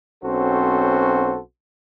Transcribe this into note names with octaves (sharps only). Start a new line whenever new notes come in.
B1 C4 C#4 F#4 A4 C5